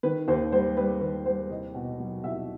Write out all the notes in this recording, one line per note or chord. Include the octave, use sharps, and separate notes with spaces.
D#3 B4
D#2 C5
G3 C5
G3 B4
D#2 B4
G3 C5
C2 D#5
B2
F#3
C2 E5